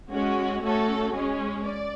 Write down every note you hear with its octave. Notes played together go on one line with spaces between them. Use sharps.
G#3 C#4 F#4
A3 C#4 F#4 A4
G#3 C#4 G#4
D5